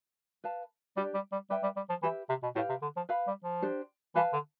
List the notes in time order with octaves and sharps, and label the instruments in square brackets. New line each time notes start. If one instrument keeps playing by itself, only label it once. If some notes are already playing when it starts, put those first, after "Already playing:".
[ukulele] B4 F5 A5
[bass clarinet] G3 [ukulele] D4 G4 D5
[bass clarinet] G3
G3
[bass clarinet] G3 [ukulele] B4 E5 G5
[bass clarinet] G3
G3
F3
[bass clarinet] E3 [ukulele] G4 B4 E5
[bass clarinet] C3
B2
[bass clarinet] A2 [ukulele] G4 B4 F5
[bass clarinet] C3
D3
F3
[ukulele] B4 F5 B5
[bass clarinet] G3
F3
[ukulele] D4 G4 C5
[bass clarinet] E3 [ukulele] B4 F5 A5
[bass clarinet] D3